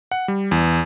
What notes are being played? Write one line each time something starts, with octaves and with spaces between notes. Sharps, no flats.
F#5
G3
E2